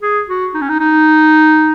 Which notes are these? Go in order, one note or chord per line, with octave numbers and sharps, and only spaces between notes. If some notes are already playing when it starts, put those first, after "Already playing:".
G#4
F#4
D#4
C#4
D#4
D#4